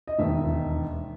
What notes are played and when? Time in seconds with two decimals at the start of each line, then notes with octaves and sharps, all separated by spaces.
0.08 D#5
0.19 E1 D#2 D#3 E5